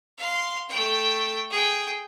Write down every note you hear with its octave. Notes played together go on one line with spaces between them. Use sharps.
F5 C6
A3 G5
G#4 G5